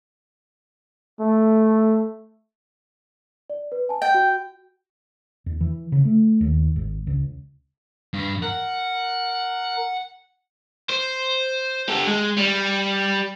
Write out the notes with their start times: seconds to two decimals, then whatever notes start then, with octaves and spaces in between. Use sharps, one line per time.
1.20 A3
3.50 D5
3.72 B4
3.89 G#5 A5
4.02 D#5 G5
4.14 F#4
5.46 E2
5.61 E3
5.92 C#3
6.05 A3
6.41 D#2
6.76 G#1
7.07 C#2
8.14 G2
8.42 A#4 F#5
10.89 C5
11.89 G4 A4
12.07 G#3
12.38 G3